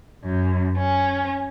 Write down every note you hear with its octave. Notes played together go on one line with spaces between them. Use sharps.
F#2
C#4